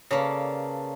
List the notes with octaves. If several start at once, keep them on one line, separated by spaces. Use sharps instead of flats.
C#3 A#3 A4 B4 C#5 D5